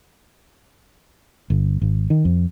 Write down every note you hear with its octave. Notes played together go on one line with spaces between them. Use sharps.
G1
G#1
D#3
F2